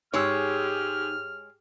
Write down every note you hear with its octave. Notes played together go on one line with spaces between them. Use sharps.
G#2 G#3 G4 G#4 C#5 E6 F6